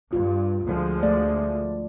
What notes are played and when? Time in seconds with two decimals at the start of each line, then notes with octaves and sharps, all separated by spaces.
0.13 G2 F4
0.66 D2 F3 G#3
1.03 A3 D5